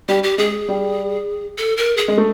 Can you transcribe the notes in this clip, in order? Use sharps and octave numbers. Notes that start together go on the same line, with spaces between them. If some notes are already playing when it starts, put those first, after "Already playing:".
G3 G4
G4
G#3 G#4
G3
A4
A#4
G#4
G#3
A3